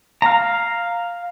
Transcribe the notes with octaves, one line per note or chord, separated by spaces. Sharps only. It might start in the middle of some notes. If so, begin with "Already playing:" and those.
F5 A#5